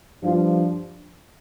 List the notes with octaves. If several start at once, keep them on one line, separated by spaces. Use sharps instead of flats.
G2 F3 D4 F4